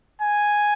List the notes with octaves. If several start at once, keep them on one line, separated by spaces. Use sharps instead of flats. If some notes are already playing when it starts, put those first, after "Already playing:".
G#5